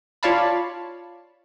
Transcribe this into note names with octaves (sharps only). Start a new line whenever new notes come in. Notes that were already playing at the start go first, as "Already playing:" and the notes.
F4 C#5 D5 F5 A5 B5